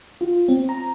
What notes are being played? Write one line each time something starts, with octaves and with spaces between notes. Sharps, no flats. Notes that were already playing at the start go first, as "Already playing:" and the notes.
F4
C4
A#5